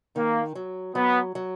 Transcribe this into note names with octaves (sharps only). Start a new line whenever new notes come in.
D#3 A#3
F#3
F#3 B3
F#3